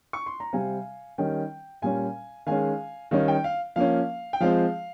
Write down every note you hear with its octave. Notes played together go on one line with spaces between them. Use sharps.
C#6
C6
A#5
C3 G3 C4 F5 G#5
D#3 G3 C#4 G5
A#2 G3 C#4 F5 G#5
D#3 G#3 C#4 F5 G#5
D#3 G3 C#4 F5
G5
F5
F3 A#3 C#4 F5
G5
F3 G#3 C4 F5